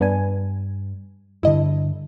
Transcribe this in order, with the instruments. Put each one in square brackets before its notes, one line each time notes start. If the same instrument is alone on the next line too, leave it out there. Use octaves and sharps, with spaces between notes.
[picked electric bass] G2 [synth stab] B3 D4 G#5
[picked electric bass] G2 D3 [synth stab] E4 D#5